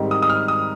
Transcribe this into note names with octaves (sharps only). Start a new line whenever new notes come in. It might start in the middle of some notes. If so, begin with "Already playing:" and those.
Already playing: G#2 D#3 G3 C4 D#4
D#6
D#6
F6
D#6